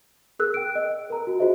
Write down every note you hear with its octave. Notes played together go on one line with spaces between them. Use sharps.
G#4 A#4 E6 F#6
G5 D7
D#5
A#4 A#5
F#4
F4 F#4 G#4 C5 D#5 E5